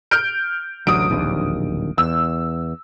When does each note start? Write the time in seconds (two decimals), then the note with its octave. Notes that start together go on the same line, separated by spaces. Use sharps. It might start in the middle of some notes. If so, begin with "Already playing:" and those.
0.11 F6 G6 D7
0.87 A1 D2 F#3 D#6 D7
1.10 D1 A#1 D#2
1.98 E2 E6